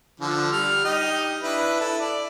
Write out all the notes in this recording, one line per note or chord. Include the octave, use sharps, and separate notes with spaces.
D3 F3
G3 F6
D#4 G4 D#5
D4 E4 B4
E4 A4
D5